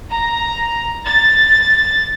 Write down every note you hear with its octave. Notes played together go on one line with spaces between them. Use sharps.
A#5
A6